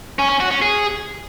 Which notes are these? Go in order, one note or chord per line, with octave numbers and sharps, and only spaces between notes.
C#4
C#4
F#4
C#4
G#4